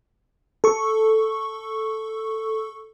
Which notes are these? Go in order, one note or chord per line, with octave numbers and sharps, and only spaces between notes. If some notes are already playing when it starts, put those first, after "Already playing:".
A4 C#6